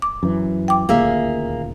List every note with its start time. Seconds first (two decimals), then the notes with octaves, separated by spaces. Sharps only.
0.02 D6
0.23 F#2 E3
0.68 G5 D6
0.89 D#1 D2 A#2 A#3 G#4 E5